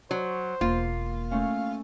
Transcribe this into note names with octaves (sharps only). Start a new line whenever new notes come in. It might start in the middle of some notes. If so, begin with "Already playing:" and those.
F#3 C5
E1 A#3 F4
A3 C#4 F5